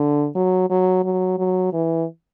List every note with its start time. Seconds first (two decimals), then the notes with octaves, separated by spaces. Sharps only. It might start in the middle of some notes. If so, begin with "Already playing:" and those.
Already playing: D3
0.35 F#3
0.70 F#3
1.04 F#3
1.38 F#3
1.73 E3